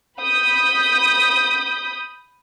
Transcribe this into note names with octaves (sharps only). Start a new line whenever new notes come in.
B5 D#6 G6 B6